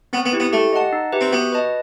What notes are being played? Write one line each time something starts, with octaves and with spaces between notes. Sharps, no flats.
B3 C4
B3
E4 G4
B3
A3 G4
D#5 F#5 A5
D#4
G4 B4 E5
C4
B3 F#4
B4 D#5 A5